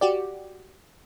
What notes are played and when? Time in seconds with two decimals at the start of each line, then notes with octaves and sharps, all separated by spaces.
0.01 F#4 G4 D5